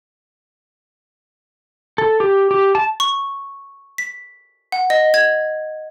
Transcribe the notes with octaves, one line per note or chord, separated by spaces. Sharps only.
A4
G4
G4
A5
C#6
B6
F#5
D#5
G#6